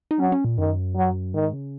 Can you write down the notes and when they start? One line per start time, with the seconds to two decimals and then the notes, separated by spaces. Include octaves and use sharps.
0.11 D#4
0.19 F#3 C#4
0.32 C#4
0.45 A#2
0.58 F#2 D#3
0.96 F#3
1.34 G#2 D#3
1.53 C#3